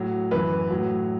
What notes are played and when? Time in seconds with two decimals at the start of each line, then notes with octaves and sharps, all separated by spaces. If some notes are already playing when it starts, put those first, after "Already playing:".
Already playing: A2 F#3
0.31 F#2 E3 B4
0.71 A2 F#3